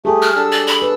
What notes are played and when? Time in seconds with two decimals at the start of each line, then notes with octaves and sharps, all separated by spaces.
0.05 A3 G4 G#4
0.22 F6
0.36 D4 A4 E6
0.52 D5
0.67 B5
0.82 B4